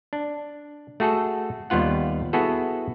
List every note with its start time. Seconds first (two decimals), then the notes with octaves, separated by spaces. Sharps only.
0.13 D4
1.00 A3 F#4 G#4 A4
1.70 D#2 G3 B3 F4 F#5
2.33 B3 E4 F#4 G#4 A4